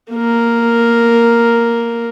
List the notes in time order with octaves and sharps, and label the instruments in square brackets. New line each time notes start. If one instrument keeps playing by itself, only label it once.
[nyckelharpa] A#3 A#4